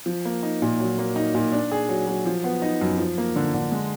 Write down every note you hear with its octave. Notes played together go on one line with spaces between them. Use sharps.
F3
A#3
D#4
A#2
F#3
A#3
D#4
A#2
D4
G#4
F#3
F#3
F3
B3
D#4
F#2
F3
A#3
D3
D3
G#3